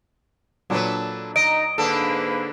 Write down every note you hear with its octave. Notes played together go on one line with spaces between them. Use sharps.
A#2 F#3 D4 A4 B4
D#4 D#5 A#5 D7
G#2 D3 A#3 D4 A4 B4